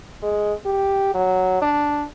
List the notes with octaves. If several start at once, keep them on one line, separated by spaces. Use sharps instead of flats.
G#3
G4
F#3
D4